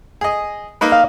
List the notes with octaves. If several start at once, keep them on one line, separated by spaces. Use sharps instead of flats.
G#4 D#5
A#3 D#4 B4
F5